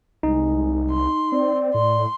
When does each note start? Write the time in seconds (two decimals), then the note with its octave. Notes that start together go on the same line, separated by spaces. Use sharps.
0.23 C2 G#3 D#4
0.91 C6
1.32 C4 D5
1.74 A2 C6